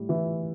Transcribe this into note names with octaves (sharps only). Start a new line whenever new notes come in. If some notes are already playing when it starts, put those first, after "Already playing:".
Already playing: A2 G3
E3